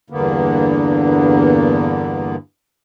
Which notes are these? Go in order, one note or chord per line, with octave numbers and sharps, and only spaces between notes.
E2 G2 D3 A#3 B3